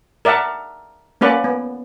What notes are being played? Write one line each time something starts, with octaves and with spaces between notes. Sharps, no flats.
A#4 D5 E5 F#5 A5
A#3 C#4 B4 D5 F#5
B3